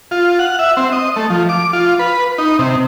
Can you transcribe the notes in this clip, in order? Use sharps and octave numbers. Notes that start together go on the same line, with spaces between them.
F4
F#5
E5
C4
D#5
A3
F3
D6
F4
B4
D#4
C3